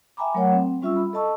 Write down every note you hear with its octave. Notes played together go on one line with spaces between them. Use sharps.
E5 G5 G#5 A#5 B5 D6
F#3 A3 A#4 C#5 F#5 G5
C4
G3 C#4 F4 E5 C#6 E6
B5
A4 D#5 A5 C#6 E6